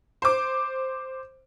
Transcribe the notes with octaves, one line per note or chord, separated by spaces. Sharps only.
C5 D6